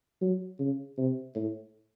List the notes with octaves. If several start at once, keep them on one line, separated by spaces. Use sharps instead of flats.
F#3
C#3
C3
A2